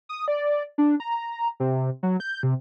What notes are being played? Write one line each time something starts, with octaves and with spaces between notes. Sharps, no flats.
D#6
D5
D4
A#5
C3
F#3
G6
C3